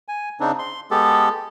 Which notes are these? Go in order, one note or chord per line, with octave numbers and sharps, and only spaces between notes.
G#5
C#3 C4 D4 D#4
C6
G#3 B3 G4 A4